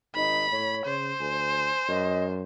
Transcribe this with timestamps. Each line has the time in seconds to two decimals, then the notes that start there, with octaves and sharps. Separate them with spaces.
0.15 G#1 D#4 B5
0.52 A2 C#5
0.85 C#3 C5
1.20 D2 G#5
1.89 F#2 D#5